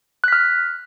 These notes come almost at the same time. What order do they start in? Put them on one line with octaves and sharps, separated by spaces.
F#6 B6 F6